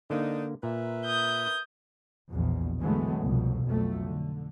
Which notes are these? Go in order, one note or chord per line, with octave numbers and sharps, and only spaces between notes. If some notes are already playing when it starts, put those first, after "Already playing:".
G#2 D3 A#3 D4 D#4
A#2 A#4 B4 E5
D#6 G6
A#1 E2 B2
D3 E3 F#3 G#3 A3 B3
C2 F2 B2
B1 F2 A3
D3